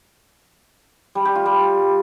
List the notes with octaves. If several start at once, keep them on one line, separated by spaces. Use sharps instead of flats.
G3
G4
F4
G3